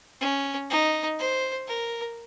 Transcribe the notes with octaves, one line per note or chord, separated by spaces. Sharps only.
C#4
D#4
C5
A#4